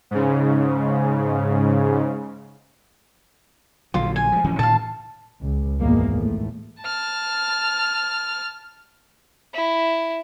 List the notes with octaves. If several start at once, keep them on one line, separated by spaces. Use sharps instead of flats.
G#2 C#3
A#1 D3 F#3 F4
G#5
F3 G#3
D1 E3 C#4
A2 D#3 F5 A5
C#2
G#1 E2 G#3 A#3
A2
A5 F6
E4